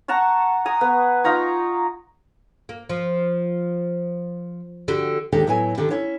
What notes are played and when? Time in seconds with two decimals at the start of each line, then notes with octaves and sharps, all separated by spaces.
0.08 F#5 A5 A#5 C#6
0.65 G#5 A#5 D#6
0.81 B3 B4
1.24 D#4 F4 A#5 C#6
2.69 A#3
2.89 F3
4.88 D3 F#4 G4
5.32 D#2 D#3 G#3 D4 G4 A4
5.47 A2 F#3 B3 E4 F#5 G#5
5.77 D3 D#3 D4 G4
5.90 C#4 E4 C#5